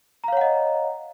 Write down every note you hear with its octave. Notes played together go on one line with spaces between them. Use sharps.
C#5 D#5 F5 F#5 A#5